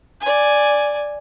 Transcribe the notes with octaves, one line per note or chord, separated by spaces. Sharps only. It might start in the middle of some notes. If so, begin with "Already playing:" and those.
D5 G#5